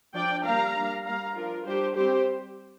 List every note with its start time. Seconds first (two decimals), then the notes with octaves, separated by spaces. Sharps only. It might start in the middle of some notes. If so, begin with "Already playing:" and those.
0.14 F3 D4 D5 G5
0.44 G3 A#3 D4 F5 A#5
0.75 G3 A#3 D4
1.05 G3 A#3 D4 F5 A#5
1.36 F3 D4 F4 A#4
1.66 G3 D4 G4 C5
1.96 G3 C4 G4 C5